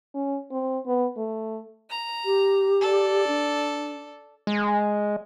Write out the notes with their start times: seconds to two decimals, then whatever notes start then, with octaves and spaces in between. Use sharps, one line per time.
0.15 C#4
0.51 C4
0.87 B3
1.17 A3
1.90 A#5
2.25 G4
2.82 A4 D5
3.27 D4
4.47 G#3